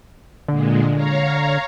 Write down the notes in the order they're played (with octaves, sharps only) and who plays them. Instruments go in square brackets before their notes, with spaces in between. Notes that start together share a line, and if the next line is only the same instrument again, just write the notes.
[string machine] A#2 G#3 [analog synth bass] D3
[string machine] C#5 F5 A#5